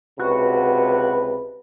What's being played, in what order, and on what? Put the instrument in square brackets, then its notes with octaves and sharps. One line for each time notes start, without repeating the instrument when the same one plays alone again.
[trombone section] C#2 C3 B4 [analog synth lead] F#4